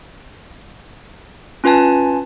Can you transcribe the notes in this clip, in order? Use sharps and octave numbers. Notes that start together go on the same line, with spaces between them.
C#4 F4 B4 G#5 A5